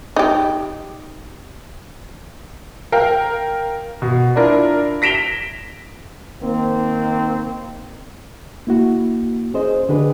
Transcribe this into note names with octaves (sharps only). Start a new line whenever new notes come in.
D#4 G4
A#4 F5 G5
B2
D4 E4 F4 A#4
A#6 B6 D7 E7 F7 G7
D#3 A#3 C4
A#3 E4 F#4
C#4 G#4 C5 D#5
D3 D4 G4 G#4 B4